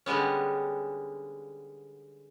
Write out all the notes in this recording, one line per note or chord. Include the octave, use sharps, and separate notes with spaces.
D3 G3 G#3 B3 C#4